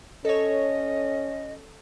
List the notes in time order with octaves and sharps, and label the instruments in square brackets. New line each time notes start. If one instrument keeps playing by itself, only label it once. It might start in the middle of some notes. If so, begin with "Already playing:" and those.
[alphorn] C#4 [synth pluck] A4 C#5 [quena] D#5